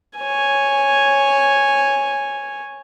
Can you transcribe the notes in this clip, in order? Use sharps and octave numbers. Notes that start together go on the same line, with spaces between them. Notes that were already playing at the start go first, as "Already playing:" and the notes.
C#5 G#5